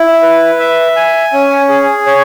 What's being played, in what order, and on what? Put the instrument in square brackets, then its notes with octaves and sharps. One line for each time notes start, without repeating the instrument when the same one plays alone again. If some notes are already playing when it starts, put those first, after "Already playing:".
Already playing: [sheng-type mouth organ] E4
B4
E5
G#5
C#4
G#4
C#5